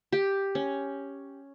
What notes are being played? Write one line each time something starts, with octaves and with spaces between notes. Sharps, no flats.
G4
C#4